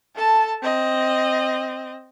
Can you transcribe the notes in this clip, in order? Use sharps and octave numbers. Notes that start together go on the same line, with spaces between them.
A4 A5
C4 D#5